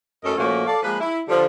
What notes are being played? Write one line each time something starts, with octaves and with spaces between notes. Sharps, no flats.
F#2 A3 C#4 A4 A#4 D#5
A#2 F3 A3 A#3 C#4 F#4
A4 D5 F5
F3 G#3 A#3 B4
E4
D3 F3 G3